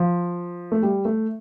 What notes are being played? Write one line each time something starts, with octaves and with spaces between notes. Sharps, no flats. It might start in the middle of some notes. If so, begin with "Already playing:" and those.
Already playing: F3
A3
G3
A3